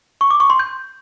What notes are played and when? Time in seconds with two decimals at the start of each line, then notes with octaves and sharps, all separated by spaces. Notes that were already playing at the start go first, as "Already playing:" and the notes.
0.21 C#6
0.31 D6
0.40 C#6
0.50 C6
0.59 G6